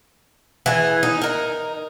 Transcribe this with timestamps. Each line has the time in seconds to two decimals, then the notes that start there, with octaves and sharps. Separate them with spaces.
0.66 E3 G#4
1.03 D#4
1.22 D#4 A#4